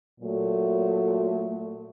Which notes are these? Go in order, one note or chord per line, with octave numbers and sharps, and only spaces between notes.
A#2 F#3 A3